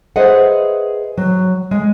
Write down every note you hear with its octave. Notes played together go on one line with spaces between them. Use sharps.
G#4 B4 C5 D#5 E5 F#5
F#3
G#3